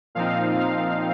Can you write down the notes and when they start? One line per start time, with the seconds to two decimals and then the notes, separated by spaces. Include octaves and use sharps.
0.15 A#2 F3 C4 D#4 F5
0.59 F5